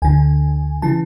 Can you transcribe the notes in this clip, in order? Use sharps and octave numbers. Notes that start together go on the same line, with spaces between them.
D2 D3 G#5
C#3 E3 A5